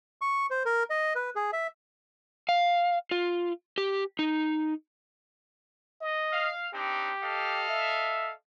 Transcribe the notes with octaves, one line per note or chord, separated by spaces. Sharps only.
C#6
C5
A#4
D#5
B4
G#4
E5
F5
F4
G4
D#4
D#5
F5
C4 D4 D#4 G4
A4 D#5 F5
E5